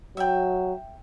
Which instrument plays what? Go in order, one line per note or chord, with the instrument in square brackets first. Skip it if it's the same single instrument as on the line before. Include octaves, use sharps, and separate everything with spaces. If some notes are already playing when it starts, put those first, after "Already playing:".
[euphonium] F#3 [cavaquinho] E5 G5